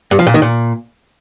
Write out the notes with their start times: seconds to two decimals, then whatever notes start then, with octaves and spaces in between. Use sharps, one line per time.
0.11 G2
0.19 F3
0.27 A#2
0.34 D#3
0.42 A#2